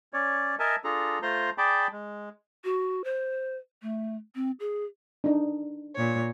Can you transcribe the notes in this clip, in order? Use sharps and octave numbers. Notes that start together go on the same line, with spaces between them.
C#4 C#5 D5
A#4 D#5 E5 G#5 A5
D4 F4 G#4 A4 A#5
A3 F4 C5 A#5 C6
G#4 D5 G5 A5 B5 D6
G#3
F#4
C5
A3
C4
G#4
D4 D#4
A#2 C#5